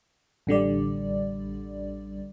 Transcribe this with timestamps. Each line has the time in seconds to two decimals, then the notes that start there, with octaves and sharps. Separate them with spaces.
0.47 A1 D3 G3 D5